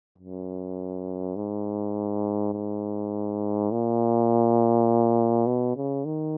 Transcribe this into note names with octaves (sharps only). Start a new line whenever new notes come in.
F#2
G#2
G#2
A#2
B2
C#3
D#3